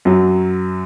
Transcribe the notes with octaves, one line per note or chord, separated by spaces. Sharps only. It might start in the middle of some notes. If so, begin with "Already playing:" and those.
F#2 F#3